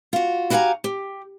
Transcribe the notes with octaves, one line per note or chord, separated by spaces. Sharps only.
F4 F#4
E4 F#4 G4 F5 G#5 A#5
G4